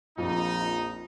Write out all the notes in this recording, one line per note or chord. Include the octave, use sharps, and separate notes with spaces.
A#1 F2 D#4